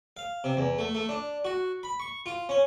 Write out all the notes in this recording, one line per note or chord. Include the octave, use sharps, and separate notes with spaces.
F5
C3
E2
A3
A3
D4
F#4
B5
C#6
F4
C#4